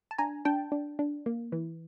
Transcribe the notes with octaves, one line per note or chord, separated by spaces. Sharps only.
A5
D4 G#5 A#5
D4 G5 A5
D4
D4
A#3
E3